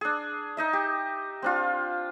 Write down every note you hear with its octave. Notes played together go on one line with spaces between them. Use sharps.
D4 G#4
D#4 D#5 E5
G4
C4 D4 F4